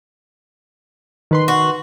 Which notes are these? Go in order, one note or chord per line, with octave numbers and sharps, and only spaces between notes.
D#3 B4 C6
F#4